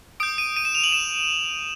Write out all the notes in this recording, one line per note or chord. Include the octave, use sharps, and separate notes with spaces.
D#6 G6 D7
D#7
D#7
E7
F7
F#7
E7